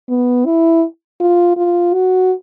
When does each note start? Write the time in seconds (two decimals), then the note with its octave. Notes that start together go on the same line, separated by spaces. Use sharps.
0.09 B3
0.45 E4
1.20 F4
1.57 F4
1.94 F#4